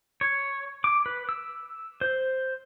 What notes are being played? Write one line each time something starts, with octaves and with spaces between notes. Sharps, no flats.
C#5
D6
B4
E6
C5